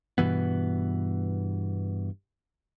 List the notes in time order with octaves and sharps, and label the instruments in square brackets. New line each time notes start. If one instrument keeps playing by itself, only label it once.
[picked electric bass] G2 B2 E3 B3